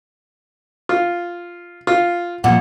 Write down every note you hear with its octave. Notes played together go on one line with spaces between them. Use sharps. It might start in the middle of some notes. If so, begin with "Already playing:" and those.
F4
F4
A#2 F3 F#5